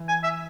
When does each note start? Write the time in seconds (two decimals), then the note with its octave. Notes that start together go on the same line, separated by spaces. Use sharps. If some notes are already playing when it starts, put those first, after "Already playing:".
Already playing: E3
0.08 G#5
0.23 E5